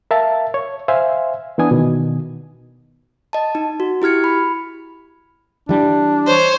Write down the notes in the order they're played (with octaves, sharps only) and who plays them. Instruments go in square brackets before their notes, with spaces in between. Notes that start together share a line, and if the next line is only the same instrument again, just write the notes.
[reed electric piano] A#4 E5 F5 A5
C#5
C5 E5 F5 G#5
E3 B3 D4 G#5 D#6
B2 D#3
[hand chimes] D#5 A5
D#4
F#4
E4 G4 F6 G#6 C#7
B5
[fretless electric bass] E3 G3 [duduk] D4
[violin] C5 C#5